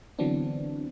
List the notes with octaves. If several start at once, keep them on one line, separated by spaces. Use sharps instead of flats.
D3 E3 F#3 B3 C4 D4